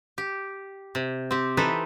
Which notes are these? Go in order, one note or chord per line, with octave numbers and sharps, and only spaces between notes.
G4
C3
C4 G4
E3 D#4 A4 B4 C5